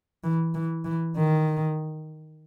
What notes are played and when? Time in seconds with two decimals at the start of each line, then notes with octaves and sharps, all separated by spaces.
0.24 E3
0.55 E3
0.85 E3
1.17 D#3